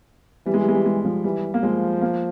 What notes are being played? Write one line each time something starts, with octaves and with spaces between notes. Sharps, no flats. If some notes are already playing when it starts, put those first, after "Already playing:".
E3 G3
G#3
G3
G#3
G3
G#3
F3
E3 G3
A#3
F3 G#3
A#3